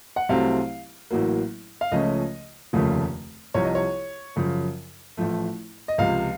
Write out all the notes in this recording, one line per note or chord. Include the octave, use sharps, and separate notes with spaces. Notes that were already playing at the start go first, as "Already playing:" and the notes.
F#5
C2 C3 F#3 A3 C4 F5
A1 A2 F#3 A#3
F5
C#2 C#3 F3 A3 C#4 D#5
F1 D#2 C#3 F3 A3
C2 C3 F3 C#5
D#5
C#5
F#2 C#3 F3
A1 A2 F3 A3
D#5
C#2 C3 F3 F5